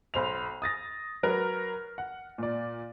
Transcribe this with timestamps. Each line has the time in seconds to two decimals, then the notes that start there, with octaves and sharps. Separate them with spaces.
0.14 B1 C5 B5 F7
0.62 D#6 A6 A#6
1.23 F#3 A#4 B4 F6
1.98 F#5
2.38 A#2 D5